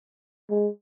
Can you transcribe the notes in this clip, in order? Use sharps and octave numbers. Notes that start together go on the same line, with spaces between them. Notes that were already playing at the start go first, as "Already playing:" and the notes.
G#3